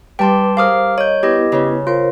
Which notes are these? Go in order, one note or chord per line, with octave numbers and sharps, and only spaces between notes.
G3 B4 G5 A5 C6 D6
G#4 A#4 C5 F5 D6 D#6 F6
C#5 D#5 G6
B3 E4 G4 B4 D#5
C#3 C#4
F4 A#4 C5 C#5